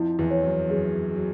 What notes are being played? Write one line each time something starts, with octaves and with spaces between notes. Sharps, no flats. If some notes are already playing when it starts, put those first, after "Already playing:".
Already playing: F2 F3 E4
E2 E3
C#5
F#2 F#3
F#2 F#3 G#4
G#4
F#3